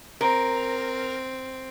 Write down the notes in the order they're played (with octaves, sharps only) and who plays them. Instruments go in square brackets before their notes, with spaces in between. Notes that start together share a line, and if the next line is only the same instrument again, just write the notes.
[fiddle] C4 [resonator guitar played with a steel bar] A#4